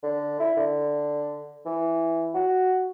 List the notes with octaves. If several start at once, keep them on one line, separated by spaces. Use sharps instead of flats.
D3
E4
D3
E3
F#4